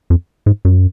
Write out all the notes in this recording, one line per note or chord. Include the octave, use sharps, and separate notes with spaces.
F2
G#2
F#2